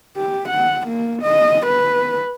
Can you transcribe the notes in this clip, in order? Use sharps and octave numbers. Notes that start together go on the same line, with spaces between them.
G4
F#5
A#3
D#5
B4